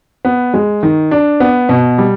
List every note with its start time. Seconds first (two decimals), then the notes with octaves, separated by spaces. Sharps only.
0.25 B3
0.54 G#3
0.83 D#3
1.11 D4
1.40 B3
1.69 B2
1.98 G3